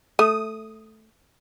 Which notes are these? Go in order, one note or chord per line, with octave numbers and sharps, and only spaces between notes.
A3 D#6